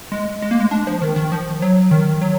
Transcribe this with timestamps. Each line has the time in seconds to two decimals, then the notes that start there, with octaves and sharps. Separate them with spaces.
0.12 G#3
0.42 G#3
0.51 A#3
0.60 G#3
0.71 D4
0.87 F3
1.02 D#3
1.16 D#3
1.32 F3
1.62 F#3
1.91 D#3
2.21 F#3